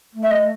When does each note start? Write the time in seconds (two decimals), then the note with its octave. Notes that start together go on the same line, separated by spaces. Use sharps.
0.14 A3
0.23 E5
0.31 D#5